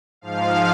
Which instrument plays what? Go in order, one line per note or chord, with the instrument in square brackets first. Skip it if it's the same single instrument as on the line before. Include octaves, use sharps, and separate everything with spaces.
[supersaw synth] G#2 F3 F5